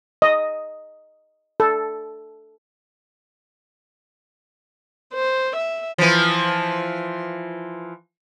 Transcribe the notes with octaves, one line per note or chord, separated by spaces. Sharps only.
D#5
A4
C5
E5
E3 F3